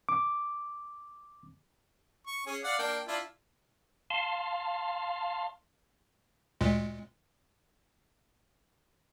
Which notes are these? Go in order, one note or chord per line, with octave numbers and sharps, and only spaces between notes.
D6
C#6
C#4 G#4
D5 F5 F#5
A#3 D4 G5
D4 E4 F4
F5 A5 C6
D2 A#2 G#3